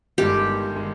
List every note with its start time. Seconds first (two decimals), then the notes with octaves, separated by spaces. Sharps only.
0.18 G1 G2 D#3 G#3 G4
0.76 D#3 G#3